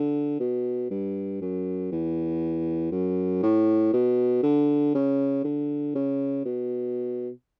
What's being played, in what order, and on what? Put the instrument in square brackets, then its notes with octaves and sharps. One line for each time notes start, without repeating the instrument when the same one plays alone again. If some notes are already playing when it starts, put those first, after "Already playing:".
Already playing: [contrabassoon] D3
B2
G2
F#2
E2
F#2
A2
B2
D3
C#3
D3
C#3
B2